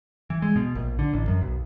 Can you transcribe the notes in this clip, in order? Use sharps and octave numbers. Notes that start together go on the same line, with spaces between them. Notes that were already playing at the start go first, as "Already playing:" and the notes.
E3
G#3
B2
A#1
D3
A1
F#2
B1